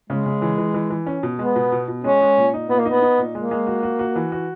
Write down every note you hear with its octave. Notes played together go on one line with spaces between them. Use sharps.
C#3 G#3
C#3
E3
E3
E3
E3
C#4
B2
G#3 B3
B2
B2
B2
G#3 C#4
G#3
A#2
D#4
A#2 B3
A#3
B3 D#4
D#4
A#2
G#3 A#3
G#3
F#4
F#4
F#4
E3
F#4